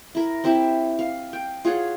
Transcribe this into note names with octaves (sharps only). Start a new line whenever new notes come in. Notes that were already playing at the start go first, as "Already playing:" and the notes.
E4 A#4
C4 E4 G4 E5
F5
G5
F4 G#4 C#5 F#5